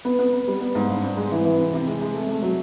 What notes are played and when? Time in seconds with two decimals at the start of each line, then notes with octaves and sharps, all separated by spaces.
0.05 B3
0.19 B3
0.33 B3
0.48 G3
0.61 B3
0.75 G#2
0.89 G2
1.03 C4
1.17 G#3
1.32 E3
1.45 E3
1.59 C3
1.73 C3
1.87 G#3
2.02 G#3
2.14 A3
2.29 A3
2.42 F#3